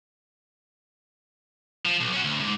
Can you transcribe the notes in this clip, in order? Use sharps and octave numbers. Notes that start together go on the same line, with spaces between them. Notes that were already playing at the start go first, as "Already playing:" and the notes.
F3
B1
C#4 F#4
D2
C#2 G#2